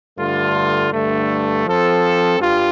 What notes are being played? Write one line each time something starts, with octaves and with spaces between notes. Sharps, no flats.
G2 D3 A3 F4
G2 D3 A3
F3 C4 A4
G2 G3 F4